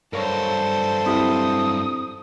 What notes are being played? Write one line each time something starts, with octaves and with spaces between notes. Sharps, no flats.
G2 F#3 A4 A#4 C5 C#5
C4 E4 G4 D#6